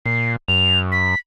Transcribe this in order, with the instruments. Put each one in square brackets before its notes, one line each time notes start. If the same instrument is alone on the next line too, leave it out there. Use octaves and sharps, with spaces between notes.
[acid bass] A#2 [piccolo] C7
[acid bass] F#2 [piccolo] F7
[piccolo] B6